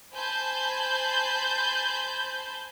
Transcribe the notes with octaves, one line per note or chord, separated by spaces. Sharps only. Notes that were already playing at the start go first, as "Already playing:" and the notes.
C5 G#5 A5 B5 G6